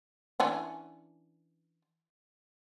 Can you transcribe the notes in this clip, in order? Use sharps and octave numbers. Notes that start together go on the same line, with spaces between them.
E3 C#4 D4